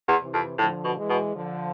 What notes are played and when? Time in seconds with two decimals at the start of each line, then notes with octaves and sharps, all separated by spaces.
0.08 E2
0.21 C3 E3
0.33 F2
0.58 A2 D3 F3
0.84 B2
0.97 E3 G#3
1.10 B2
1.35 D3 F3